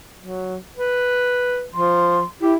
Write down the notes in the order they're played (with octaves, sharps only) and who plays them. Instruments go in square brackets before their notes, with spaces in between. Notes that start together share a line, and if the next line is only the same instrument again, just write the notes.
[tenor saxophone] F#3
B4
[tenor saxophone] F3 [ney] C6
[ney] E4 [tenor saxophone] G4